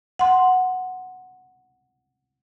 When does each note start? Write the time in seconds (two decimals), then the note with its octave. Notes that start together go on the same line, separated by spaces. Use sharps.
0.19 F#5 C6